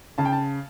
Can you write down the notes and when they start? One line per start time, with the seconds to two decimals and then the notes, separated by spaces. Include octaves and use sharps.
0.18 C#3 A5
0.25 G5
0.32 A5